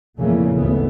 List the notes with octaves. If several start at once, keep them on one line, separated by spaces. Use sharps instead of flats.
F2 A#2 C#3 E3 A3 A#3
G#1 D2 C#3 A3 B3